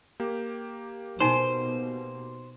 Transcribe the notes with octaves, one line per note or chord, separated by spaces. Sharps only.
A#3 G4
B2 D#4 C5 G#5